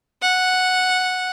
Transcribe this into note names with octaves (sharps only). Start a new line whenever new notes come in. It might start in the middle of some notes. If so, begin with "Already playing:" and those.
F#5